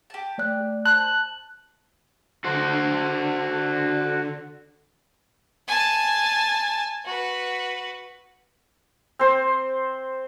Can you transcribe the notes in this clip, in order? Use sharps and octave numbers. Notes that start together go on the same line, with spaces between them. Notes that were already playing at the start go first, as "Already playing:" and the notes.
G4 A5
A3 D5 F#6
C5 A5 F#6
D3 F#4 C5
G#5 A5
F#4 B4
C4 C5